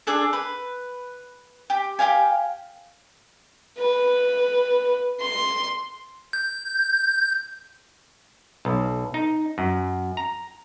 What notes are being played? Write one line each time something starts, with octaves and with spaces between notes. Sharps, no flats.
D4 G#4 A4
B4
G4
G4 G#4 F5 G#5
B4
C6
G6
B1
D#4
F#2
A#5